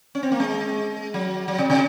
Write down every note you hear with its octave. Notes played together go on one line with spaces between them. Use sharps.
C#4
C4
A#3
G#3
F#3
F#3
C3
C3